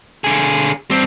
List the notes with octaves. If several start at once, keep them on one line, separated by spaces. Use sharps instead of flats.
D3 G#4
G2 C4